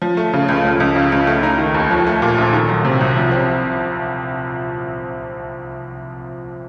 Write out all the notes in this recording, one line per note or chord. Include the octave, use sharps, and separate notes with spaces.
F3
A3
C#3
C#2
F3
C#2
C#3
C#2
A3
D#4
D#3
D#2
F3
A3
A#2
A#1
D#3
F#3
C3
C2
F3
C4